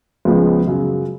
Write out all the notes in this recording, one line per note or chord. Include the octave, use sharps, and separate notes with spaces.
C#2 C#3 F3 G#3 B3
F#2 C#3 F#3